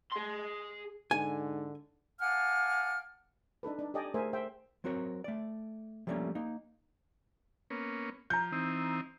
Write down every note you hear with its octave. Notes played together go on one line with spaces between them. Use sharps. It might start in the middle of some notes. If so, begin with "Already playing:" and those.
G#4 C6
G#2 D3 G#5
F5 F#5 G#5 A5 D6 F6
D4 D#4 A4 B4
D4 D#4
G4 A4 D5 D#5 G5 G#5
A3 G#4 A#4 C5 E5 G#5
C5 E5 G5
F#3 C4 F#4 A#4 C#5
A3 D5
F3 G3 A3 A#3 C4 C#4
A#3 D#4
A#3 B3 C#4
F3 A#5 G6
E3 C4 D#4